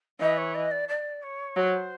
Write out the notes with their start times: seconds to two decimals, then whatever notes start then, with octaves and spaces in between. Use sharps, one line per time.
0.19 E3 D#5
0.37 C#5
0.54 D#5
0.71 D5
0.88 D5
1.22 C#5
1.56 F#3 C5